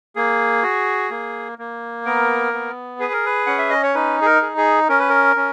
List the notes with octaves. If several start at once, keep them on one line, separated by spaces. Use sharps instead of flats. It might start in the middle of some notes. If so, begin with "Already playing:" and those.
A#3 G#4
F#4
A#3
A#3
B3 A#4
B3
G#4 B4
A#4
B4
C#4 F#5
E5
D#5
C#5
D#4 B4
G#4
A#4
G#4
G#4
C#4 A#4
B4
A#4
C#4